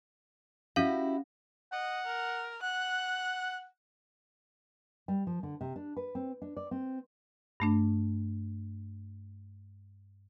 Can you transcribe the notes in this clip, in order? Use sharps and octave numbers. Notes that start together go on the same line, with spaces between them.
C#4 E4 F#4 G4 F5
D#5 F#5
A#4
F#5 F#6
G3
F3
D3
C3
D4
B4
C4
D4
D5
C4
G2 A3 D4